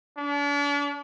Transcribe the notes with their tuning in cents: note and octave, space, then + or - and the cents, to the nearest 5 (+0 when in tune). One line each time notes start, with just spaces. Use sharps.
D4 -40